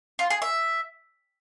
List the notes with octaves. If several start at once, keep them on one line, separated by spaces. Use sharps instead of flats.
F4
G#4
E5